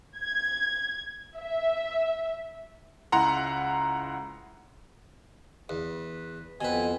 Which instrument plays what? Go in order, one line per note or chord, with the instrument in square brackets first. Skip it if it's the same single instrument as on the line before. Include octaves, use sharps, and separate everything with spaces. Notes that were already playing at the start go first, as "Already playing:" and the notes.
[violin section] G#6
E5
[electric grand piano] C#2 E4 F#5 A#5 C6
[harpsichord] E2 [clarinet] B4
[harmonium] F2 B3 C4 [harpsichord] B2 B4 [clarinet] G#5